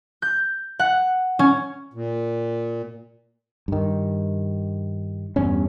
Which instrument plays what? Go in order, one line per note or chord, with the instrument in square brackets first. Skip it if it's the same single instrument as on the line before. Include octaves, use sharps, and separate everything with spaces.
[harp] G6
F#5
C#4
[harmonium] A#2
[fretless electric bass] G2 D#3
E2 G2 C#4